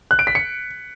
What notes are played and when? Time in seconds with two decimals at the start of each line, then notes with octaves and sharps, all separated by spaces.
0.11 F#6
0.19 D7
0.27 B6
0.35 C#7